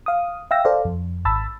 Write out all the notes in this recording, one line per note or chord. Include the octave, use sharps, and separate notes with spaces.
F5 D#6
E5 F5 G5 E6 A#6
A4 C5 D5 F5
F2
G#1 A5 B5 E6 A6